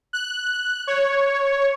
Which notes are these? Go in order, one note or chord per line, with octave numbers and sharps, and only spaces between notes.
F#6
C#5